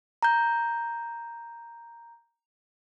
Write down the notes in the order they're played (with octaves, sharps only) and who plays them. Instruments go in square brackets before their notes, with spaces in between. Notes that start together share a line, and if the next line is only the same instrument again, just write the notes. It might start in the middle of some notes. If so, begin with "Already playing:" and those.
[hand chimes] A#5 G6